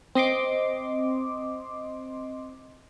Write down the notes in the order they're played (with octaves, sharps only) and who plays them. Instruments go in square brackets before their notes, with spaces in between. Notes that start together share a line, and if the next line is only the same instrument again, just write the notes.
[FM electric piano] C4 D#5 C6 D6